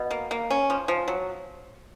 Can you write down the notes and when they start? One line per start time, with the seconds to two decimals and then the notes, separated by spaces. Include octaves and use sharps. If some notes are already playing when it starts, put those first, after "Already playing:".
Already playing: B2
0.11 A#3
0.31 A#3
0.50 C#4
0.70 F3
0.88 F3
1.08 F#3